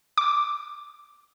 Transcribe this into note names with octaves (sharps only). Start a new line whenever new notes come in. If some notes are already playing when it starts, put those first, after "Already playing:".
D6